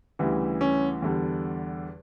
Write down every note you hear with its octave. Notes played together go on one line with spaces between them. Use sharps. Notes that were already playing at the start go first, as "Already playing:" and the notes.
D2 C#3 E3 G3
C#4
E2 D3 G3